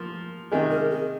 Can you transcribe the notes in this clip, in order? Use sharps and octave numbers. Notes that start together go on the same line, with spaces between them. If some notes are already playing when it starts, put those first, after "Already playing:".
Already playing: F3 A#3 F4
C3 D#3 G#3 G#4
A#4
G#4